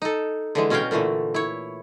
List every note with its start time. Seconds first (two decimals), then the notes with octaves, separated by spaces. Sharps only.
0.02 D#4 A4
0.55 D3 E3 G#3
0.70 B2 C#4 F#4 C#5 F5 G5
0.91 A#2 D3 E3 A3
1.34 E4 C#5